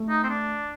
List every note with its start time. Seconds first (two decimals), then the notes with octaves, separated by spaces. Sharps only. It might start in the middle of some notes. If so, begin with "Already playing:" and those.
Already playing: A3
0.09 D#4
0.24 C4
0.30 D4